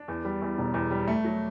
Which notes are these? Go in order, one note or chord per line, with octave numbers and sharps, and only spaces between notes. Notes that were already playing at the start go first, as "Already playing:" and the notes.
Already playing: D4
E2
G3
E2
E1
E2
G3
A3
F#3